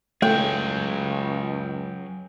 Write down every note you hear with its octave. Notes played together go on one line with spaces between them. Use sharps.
C#2 F#3 A3 G#4 G5